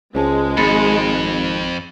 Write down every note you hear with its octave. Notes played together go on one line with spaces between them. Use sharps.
C#2 G#3 C5 A5
G#1 F2 B5 A6 C#7